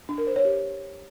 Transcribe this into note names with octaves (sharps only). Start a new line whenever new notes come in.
D4
A#4
C5
C#5
G4